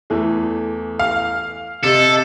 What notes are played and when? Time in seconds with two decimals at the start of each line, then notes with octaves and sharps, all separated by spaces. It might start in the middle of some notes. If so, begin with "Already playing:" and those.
0.10 E2 E3 A3
0.99 F5
1.84 C3 A4 D#5